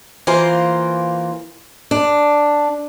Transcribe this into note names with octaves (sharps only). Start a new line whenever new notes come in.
E3 A#3 F4 C5
D4